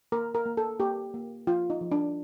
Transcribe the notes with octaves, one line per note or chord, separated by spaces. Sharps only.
A#3 A#4
A#4
A#3
A4
A#3 G4
A#3
F3 F4
D#4
F3
D4